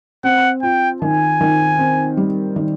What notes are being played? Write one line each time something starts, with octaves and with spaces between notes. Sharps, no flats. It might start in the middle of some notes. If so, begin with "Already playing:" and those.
C4 F#5
F4 G5
D#3 G#5
D#3
C4
G3
D#3